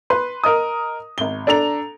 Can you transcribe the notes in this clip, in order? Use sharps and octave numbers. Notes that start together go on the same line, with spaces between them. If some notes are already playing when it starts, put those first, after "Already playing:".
B4 C6
A#4 D#5 D#6
G#1 G7
D4 A4 A#5 F7